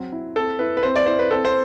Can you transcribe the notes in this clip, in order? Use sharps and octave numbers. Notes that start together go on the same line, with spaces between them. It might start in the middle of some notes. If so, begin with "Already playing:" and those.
Already playing: F#3 C4
E4
C4 A4
E4 B4
B4
C4 C5
D5
E4 C5
B4
C4 A4
C5